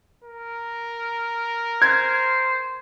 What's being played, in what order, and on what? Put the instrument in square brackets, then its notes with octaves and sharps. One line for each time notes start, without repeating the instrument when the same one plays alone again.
[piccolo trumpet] A#4
[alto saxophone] C5 [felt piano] G#6